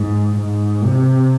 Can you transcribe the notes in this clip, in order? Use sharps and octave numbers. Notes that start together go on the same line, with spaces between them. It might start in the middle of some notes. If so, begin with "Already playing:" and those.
Already playing: G#2
G#2
C3